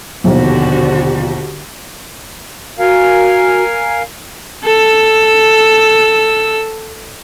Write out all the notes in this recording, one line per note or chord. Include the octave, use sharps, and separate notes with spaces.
A#1 D#2 B2 D3 F#4 G4
F#4 A#4 F5 G#5
A4 E6